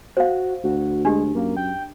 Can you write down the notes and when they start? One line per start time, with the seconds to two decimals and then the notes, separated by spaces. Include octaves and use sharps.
0.17 F#4 C5 F5
0.64 D2 F#4
1.05 G#3 D4 G4
1.35 F#2 A#3
1.57 G5